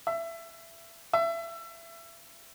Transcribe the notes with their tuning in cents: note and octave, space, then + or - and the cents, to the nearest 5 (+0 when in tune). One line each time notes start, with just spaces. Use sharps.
E5 +20
E5 +25